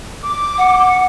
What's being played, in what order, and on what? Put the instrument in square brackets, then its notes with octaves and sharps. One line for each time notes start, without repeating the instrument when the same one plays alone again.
[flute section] D6
[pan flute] F#5